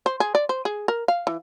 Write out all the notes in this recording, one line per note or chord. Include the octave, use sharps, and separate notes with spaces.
C5
G#4
D5
C5
G#4
A#4
F5
E3